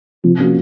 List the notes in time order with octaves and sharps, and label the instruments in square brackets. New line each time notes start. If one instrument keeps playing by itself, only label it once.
[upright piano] C3 [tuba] F3
[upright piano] F3 A#3 C#4 F#4